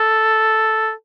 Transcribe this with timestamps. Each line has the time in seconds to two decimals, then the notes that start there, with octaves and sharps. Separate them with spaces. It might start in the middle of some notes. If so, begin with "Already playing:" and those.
Already playing: A4